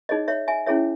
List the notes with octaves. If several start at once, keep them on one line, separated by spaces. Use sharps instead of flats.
D#4 G#4 C#5 D#5
C#5 E5
E5 G#5
C#4 E4 G#4 C#5 E5